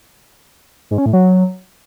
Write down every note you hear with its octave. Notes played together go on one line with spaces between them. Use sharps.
G#2
C#4
A2
F#3